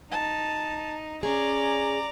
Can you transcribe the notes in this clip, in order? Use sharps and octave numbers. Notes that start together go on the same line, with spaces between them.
D#4 A5
C#4 G#4 D5 A#5